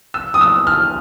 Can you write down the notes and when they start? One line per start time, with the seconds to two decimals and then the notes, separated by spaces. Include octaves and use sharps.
0.14 E6
0.34 D#6
0.41 E6
0.67 F6